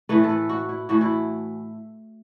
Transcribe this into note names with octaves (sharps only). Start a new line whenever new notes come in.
A2 E3 A3 B4
A4
B4
F#4
E4
A2 E3 A3 F#4
E4